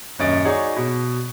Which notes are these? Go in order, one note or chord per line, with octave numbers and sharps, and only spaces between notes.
D#1 F#2 C#5 D#5 A6 D7
D#4 F#4 G#4 C#5 D5
B2